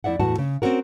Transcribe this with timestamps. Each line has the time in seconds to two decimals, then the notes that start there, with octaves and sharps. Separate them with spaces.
0.04 F2 E4 D5 E5 F#5
0.20 E2 A2 F#4 F#5 A5
0.38 C#3
0.62 C4 C#4 F#4 A#4